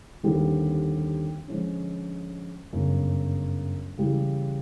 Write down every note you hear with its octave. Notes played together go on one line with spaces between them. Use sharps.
D#2 D3 G3 C4
D3 F3 G#3 C#4
G1 F#2 C#3
C#3 E3 G3